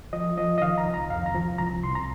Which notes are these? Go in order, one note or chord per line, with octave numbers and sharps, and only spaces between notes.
F3 D#5
F3 D#5
D#5
D#3 F5
A#5
C2
A#5
F2 F5
A#5
F3
C2 A#5
C2 C6
A#5